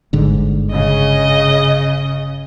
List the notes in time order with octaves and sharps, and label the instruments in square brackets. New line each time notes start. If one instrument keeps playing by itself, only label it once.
[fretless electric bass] G1 G#2 D3
[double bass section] C#3 [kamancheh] D#5